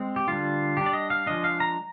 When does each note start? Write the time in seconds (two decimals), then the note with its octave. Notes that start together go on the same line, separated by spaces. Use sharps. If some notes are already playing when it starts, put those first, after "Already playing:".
Already playing: G#3 C4
0.16 G4
0.27 D3 G3 D4 F4
0.77 G3 D4 G4
0.86 D5
0.93 D#5
1.10 F5
1.26 F3 G#3 D4 D#5
1.44 F5
1.60 A#5